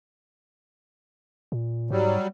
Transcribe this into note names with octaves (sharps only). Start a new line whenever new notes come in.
A#2
G#2 F#3 G3